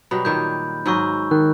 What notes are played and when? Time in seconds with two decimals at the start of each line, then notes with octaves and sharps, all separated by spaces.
0.11 B2 F#3 G3 B5
0.25 A#2 D#3 C#5 G6
0.86 G#2 F#3 D#5 C#6 E6 G6
1.31 D#3 F#6